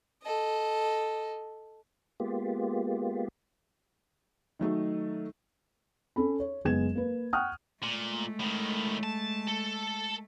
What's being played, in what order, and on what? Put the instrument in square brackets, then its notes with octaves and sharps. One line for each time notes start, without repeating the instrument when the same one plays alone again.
[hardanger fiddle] A4 D#5
[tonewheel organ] G#3 A#3 B3 F4 G4
[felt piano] D#3 F#3 A3 D#4
C#4 A4 B5
C#5
F#1 G#3 B3 G#6 E7
A#3 B4
F#5 G5 C#6 D#6 F6 F#6
[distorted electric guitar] A#2 [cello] G#3 A3
[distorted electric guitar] A2 D#3
A5
A4